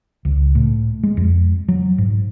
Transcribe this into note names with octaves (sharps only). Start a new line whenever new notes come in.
C#2
A2
G#3
F2
F#3
G#2